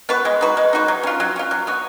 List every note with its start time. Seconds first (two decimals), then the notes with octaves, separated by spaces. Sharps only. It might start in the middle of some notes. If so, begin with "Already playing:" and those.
0.09 B3 F#4 B4
0.25 G#3
0.41 D#4 F#4 B4
0.57 G#3
0.73 D#4 F#4 B4
0.88 F#3
1.03 C#4 F4
1.20 F#3
1.36 C#4 F4
1.51 F#3
1.67 B3 F#4